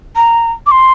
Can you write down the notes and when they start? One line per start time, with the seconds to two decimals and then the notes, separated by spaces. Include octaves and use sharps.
0.16 A#5
0.67 D6
0.71 C6